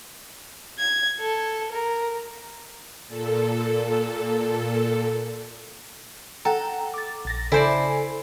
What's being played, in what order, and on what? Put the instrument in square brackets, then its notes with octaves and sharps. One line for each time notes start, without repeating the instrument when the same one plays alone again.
[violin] G#6
A4
A#4
[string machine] A#2 A4
[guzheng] A4 [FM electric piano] F#5 G5 A#5
[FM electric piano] D6 A6
A#1 A6 A#6
[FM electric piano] C#3 A4 G#5 [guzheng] E4 C5 D5